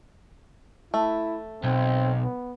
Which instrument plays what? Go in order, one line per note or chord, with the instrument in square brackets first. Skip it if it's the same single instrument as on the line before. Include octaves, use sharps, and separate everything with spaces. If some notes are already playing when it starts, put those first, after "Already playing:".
[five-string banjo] A3 [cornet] E4
[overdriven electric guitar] B1 [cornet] C4
[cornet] B3